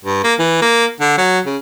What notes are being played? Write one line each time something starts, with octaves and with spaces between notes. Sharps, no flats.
G2
A#3
E3
A#3
D3
F#3
C#3